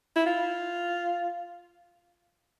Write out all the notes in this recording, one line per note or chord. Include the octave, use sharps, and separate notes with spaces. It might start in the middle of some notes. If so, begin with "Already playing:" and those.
E4
F4